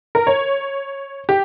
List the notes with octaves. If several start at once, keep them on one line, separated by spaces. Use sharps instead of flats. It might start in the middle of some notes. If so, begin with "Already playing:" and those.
A#4
C#5
G4